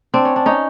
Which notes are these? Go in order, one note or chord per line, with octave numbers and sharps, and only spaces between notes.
C4 D4
C#4
D4
C#4 D#4